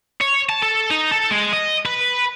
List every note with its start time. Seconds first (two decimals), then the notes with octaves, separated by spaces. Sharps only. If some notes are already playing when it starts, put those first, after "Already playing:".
0.21 C#5
0.49 A5
0.62 A4
0.91 D#4
1.11 A4
1.31 G#3
1.53 D#5
1.86 B4